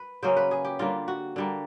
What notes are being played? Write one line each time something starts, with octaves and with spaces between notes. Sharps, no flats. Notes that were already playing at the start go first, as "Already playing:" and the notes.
Already playing: B4
C#3 F#3 A#3 C#4 C5
B4
G#4
G4
D3 G3 A#3 F4
F#4
D3 G3 A#3